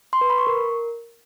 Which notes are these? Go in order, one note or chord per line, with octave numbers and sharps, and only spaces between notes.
C6
B4
B5
C#6
A#4